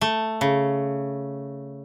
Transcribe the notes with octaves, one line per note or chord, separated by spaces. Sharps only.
A3
C#3